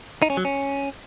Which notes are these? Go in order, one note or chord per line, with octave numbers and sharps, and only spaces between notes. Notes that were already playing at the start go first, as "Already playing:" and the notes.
D#4
C#4
F#3
C#4